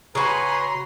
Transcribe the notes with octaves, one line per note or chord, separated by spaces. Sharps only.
C#3 F#4 B4 G#5 A#5 C6